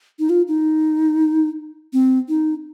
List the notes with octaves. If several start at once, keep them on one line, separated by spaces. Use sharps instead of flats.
D#4
F4
D#4
C4
D#4